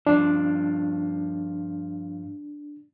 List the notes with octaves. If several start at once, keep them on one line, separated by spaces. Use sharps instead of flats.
G2 F3 D4